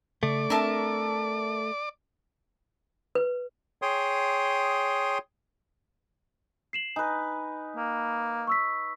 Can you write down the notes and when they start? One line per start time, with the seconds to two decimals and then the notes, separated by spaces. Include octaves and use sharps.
0.23 C#3 A3 D5 D6
0.50 C4 D4 A#4 E5 A5
3.15 B4
3.82 G#4 C#5 G5 C6 D#6
6.73 C7 E7 F#7
6.96 D#4 B4 G#5
7.76 A#3
8.47 C#6 E6 B6